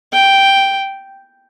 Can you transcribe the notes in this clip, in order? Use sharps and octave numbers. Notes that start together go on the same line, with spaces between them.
G5